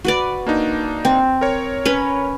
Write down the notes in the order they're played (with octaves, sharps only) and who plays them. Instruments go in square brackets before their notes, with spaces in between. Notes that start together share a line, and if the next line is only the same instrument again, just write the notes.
[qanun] F#4 B4 D5
[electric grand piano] A#3 D4 D#4
[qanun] C4
[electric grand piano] A#4 C#5
[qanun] C#4 B4 B5